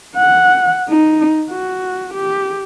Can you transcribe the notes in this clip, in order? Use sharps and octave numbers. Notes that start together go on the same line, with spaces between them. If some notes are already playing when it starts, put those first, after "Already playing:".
F#5
D#4
F#4
G4